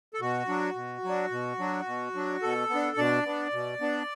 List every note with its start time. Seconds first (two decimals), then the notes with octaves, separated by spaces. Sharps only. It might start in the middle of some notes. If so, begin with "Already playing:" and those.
0.14 A4
0.21 B2 F#4
0.48 F#3 D4
0.75 B2
1.04 F#3 D4
1.31 B2
1.59 F#3 D4
1.86 B2
2.14 F#3 D4
2.42 B2 A4
2.70 B3
2.75 D4
2.97 B2 D4 D5
3.25 B3 D4
3.53 B2
3.81 B3 D4